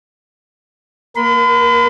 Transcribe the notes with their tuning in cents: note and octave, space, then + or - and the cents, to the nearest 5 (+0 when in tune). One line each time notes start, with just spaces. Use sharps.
A#3 +0 A#4 +30 B5 +45